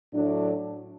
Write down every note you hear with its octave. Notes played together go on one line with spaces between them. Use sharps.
A2 F#3 A3 D4